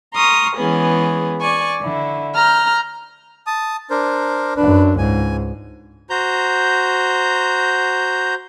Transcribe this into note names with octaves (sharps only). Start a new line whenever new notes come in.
A#5 C6 C#6 D#6 F6
E3 G#3 B3 C#4 G#4
D5 G#5 C#6
D3 E4
A#5 F6 G6
A5 D#6
D4 A#4 C5
F#2 D4 B4
C#2 G#2 G#5
F#4 C5 A#5 G6